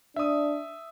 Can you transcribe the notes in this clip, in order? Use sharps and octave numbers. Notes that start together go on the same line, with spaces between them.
D4 E5 D#6